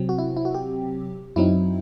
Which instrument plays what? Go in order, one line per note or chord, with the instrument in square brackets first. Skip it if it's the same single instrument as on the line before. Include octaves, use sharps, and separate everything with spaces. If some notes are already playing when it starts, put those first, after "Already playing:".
Already playing: [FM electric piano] C3 F#3 C4
F#4
E4
E4
F#4
G4
F#2 F#3 C4 D#4 E4